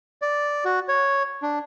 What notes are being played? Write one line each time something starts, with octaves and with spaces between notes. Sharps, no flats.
D5
F#4
C#5
D4